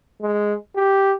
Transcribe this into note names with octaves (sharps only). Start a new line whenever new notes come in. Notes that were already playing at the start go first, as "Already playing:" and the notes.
G#3
G4